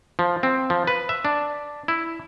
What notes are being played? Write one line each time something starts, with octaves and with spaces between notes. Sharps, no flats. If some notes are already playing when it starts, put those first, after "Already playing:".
F3
C4
F3
B4
E5
D4
E4